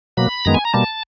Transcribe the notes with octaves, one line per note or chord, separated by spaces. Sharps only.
B2 F#3 A#3 B5
F#2 D#3 G#3 B3 A#5
G#5
A#5
B2 G3 A#3 A5